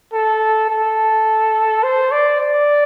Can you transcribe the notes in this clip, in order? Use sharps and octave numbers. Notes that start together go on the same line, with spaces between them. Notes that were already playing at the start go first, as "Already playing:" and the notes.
A4
A4
C5
D5
D5